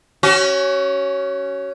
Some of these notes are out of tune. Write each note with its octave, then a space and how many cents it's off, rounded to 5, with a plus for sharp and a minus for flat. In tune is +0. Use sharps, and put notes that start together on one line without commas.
C#4 +0 F#4 +35